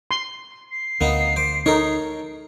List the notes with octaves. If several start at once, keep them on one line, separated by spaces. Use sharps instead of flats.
C6
C7
D2 A#3 B3 D#4
C5 D6
D#4 A4 A#4 C#5